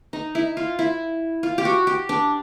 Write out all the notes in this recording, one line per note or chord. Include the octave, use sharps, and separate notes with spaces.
D#4
E4
F4
E4
F4
G4
F#4
G4
D4